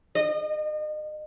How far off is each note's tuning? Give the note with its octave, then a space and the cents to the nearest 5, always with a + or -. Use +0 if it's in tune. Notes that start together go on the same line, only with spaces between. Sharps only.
D#5 -35